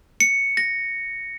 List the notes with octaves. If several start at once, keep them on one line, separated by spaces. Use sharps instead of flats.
C#7
A#6